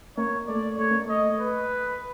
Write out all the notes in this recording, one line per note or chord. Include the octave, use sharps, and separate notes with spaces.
A#3 C#5
A3 D5
A3 C#5
A#3
A3
D#5
B4